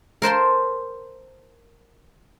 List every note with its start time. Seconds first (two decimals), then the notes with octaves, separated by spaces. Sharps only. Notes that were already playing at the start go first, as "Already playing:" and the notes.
0.22 A#4 C5 A5 C6